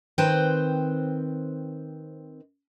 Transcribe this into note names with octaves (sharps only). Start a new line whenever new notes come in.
D#3 C4 B4 C5 G5